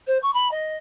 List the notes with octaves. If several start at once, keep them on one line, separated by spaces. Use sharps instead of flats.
C5
C#6
B5
D#5